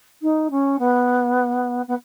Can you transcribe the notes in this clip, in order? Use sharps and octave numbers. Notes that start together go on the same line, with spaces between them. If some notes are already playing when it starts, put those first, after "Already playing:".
D#4
C#4
B3
B3